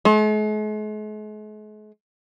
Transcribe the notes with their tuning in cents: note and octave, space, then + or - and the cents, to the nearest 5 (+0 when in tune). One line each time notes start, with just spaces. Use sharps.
G#3 +45